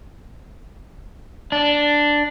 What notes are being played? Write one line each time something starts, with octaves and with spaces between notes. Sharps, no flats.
D4